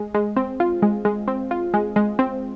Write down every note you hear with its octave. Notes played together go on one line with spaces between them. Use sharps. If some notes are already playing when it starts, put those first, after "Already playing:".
Already playing: G#3
G#3
C4
F4
G#3
G#3
C4
F4
G#3
G#3
C4